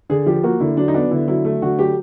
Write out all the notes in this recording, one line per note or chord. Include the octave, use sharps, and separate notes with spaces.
D3 G#4
F3 G4
A#3 F#4
D3 E4
F#3 D4
D#4
B3 D4
D3 E4
F#3 E4
A3
D3 F#4
F#3 G4